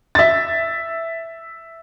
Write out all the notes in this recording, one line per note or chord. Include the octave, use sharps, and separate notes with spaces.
E5 A6